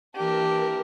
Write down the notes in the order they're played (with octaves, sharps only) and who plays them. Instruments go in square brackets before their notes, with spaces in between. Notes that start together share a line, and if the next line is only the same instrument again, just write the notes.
[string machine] E3 A#4 [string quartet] A#3 D4 G4